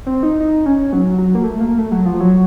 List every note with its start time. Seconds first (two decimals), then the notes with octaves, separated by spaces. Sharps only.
0.06 C4
0.23 D#4
0.40 D#4
0.66 C#4
0.93 F#3
1.18 F#3
1.35 A#3
1.43 A3
1.60 A#3
1.78 A3
1.92 F#3
2.05 F3
2.20 F#3